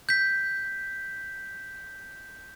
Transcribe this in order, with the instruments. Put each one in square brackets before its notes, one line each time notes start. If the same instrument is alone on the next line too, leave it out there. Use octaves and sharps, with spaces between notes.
[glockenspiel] G6 B6